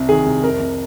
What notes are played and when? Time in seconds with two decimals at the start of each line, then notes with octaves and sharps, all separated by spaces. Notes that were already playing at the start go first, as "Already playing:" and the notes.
Already playing: C2 C3
0.09 D#3 G#4
0.26 C2
0.43 F2 A#4
0.60 C3